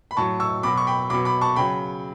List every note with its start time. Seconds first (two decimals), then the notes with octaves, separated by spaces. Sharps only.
0.11 B5
0.17 A2 F#3 A5 C#6
0.40 C#6 E6
0.63 B2 F#3 B5 D6
0.77 C#6
0.87 G5 B5
1.10 B2 F#3 B5 D6
1.25 B5 D6
1.41 A5 C#6
1.56 C#3 F#3 G5 B5